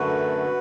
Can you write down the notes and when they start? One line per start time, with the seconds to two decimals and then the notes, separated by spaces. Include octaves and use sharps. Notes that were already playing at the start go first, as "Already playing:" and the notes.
Already playing: F#2 D3 A3 F#4 B4